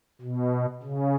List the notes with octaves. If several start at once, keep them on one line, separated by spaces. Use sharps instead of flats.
B2
C#3